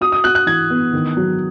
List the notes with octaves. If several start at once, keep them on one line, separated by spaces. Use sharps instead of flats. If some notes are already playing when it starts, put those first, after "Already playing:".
F#4 D#6
D#6
F#4 F#6
F#6
E3 G#6
B3
D#3
F#3